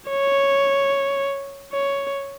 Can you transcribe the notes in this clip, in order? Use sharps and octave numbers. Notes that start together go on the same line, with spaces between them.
C#5
C#5